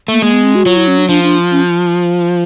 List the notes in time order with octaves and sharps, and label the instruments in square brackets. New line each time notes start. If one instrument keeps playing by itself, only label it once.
[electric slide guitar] A3 [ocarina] A#3
[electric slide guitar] G#3 [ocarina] A#3
[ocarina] B3
C4
F#4
[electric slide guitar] F#3 [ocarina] F4
[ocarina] E4
C#4
D4
[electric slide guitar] F3 [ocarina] D4
[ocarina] D4
C#4